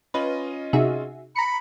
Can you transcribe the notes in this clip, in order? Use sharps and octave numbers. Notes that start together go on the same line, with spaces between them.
C#4 F4 B4 D#5
C3 D#4 F#4 G#4 E5
A#5 B5 C#7